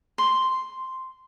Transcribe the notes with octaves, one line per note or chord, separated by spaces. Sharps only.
C6